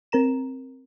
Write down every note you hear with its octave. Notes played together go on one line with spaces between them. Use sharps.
C4 A#4 A#5 E7